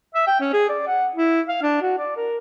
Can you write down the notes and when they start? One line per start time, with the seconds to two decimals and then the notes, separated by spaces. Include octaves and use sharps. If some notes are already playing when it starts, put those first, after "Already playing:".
0.15 E5
0.27 G5
0.41 C#4
0.53 G#4
0.69 D5
0.87 F#5
1.15 E4
1.48 F5
1.62 D4
1.82 F#4
1.98 D5
2.17 A#4